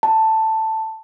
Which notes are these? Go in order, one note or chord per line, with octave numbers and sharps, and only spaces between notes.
A5